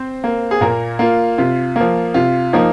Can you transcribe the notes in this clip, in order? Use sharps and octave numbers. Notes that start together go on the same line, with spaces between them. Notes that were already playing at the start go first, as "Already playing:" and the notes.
Already playing: C4 C5
A#3
G#4
A#2 A#3 A#4
A#3 F4
C3 F4
F3 A#3
C3 F4
F3 A#3 D#4